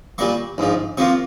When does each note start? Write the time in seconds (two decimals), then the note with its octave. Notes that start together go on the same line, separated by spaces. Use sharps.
0.18 A#2 G3 A#3 C#6
0.58 A#1 G#2 F3
0.97 C3 F3 A#3 F4 C#6